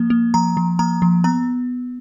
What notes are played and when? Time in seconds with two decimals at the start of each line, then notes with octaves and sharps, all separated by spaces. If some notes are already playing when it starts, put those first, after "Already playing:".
Already playing: F3 A#3
0.10 A#3
0.34 F3 A#5
0.57 F3
0.79 A#3 A#5
1.02 F3
1.24 B3 A#5